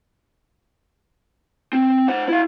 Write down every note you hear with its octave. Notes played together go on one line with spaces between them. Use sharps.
C4
C5 F#5
E4 F5